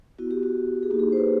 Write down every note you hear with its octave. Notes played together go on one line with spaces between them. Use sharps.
B3 E4 F#4
G4
F#4
G#4
A#3 D#4 F#4 G4
G#4
C5
B4